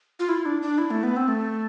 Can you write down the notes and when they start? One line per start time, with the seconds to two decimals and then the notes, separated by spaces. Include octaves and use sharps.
0.19 F4
0.29 E4
0.46 D4
0.62 D4
0.78 E4
0.90 A3
1.03 B3
1.16 C4
1.28 A3